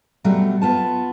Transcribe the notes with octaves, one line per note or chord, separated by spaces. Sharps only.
B2 F#3 G3 A3
B3 F4 A5